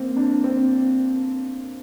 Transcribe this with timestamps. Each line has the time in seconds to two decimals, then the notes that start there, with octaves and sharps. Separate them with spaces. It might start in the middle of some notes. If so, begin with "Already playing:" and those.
Already playing: A#3 C4
0.17 D4
0.44 C4